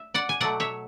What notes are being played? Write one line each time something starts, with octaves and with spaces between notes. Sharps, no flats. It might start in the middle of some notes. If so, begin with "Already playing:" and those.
Already playing: E5
D5 F#5
G#5
B2 F#3 A3 D5 F#5
C#5 E5